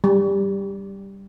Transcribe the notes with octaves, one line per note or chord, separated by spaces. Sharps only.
G3